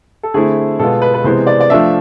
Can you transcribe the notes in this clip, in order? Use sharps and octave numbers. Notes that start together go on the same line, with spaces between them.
A4
D3 A3 C4 E4 G#4
B2 G#3 B3 F4 A4
B4
B4
C3 E3 G#3 B3 C5
D5
D5
F3 A3 D4 F4 E5